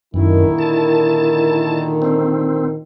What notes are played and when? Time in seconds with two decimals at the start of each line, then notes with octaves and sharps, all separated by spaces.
0.14 F#2 A#2 D3 D#3 E4
0.58 A5
2.02 C4